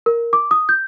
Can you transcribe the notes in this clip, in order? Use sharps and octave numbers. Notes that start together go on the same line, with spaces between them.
A#4
D6
D#6
G6